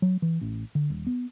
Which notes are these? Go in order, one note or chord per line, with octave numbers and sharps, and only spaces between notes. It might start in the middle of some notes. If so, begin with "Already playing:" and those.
F#3
E3
A1
D3
D#1
B3